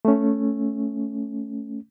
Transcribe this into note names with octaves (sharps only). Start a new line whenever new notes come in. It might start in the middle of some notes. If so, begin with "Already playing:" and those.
A3 C#4